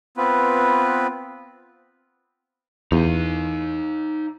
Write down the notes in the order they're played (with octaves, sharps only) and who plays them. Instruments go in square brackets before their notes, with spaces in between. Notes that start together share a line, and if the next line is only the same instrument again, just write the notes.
[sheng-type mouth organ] B3 C4 F4 B4
[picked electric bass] E2 [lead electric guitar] D#4 F5